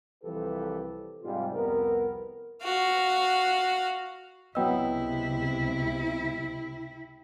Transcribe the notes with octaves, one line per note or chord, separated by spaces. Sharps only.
C2 E3 F3 G4 A4 B4
G#2 C3 G3 F4
C2 F2 B3 C4 A#4
F#4 F5
C#2 C3 F#3 B3 E4 D#5 G5 E6